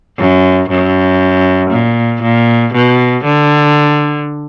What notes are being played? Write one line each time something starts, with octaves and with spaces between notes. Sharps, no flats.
F#2
F#2
A#2
A#2
B2
D3